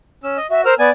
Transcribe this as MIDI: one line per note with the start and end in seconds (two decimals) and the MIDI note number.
0.23 0.37 61
0.23 0.37 88
0.37 0.47 75
0.50 0.65 66
0.50 0.62 76
0.65 0.74 70
0.65 0.75 72
0.65 0.74 88
0.65 0.74 89
0.79 0.90 59
0.79 0.91 74
0.79 0.90 80